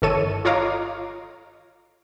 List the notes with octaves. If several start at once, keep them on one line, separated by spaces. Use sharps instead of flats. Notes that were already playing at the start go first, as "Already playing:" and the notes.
G1 D#3 E4 A4 C#5 D#7
F4 C#5 D#5 F5 A#5 D6